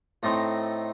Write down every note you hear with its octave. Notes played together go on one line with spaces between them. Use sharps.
A2 A3 C4 D#4